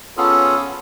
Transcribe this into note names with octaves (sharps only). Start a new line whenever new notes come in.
B3 C#4 F4 G#4 A4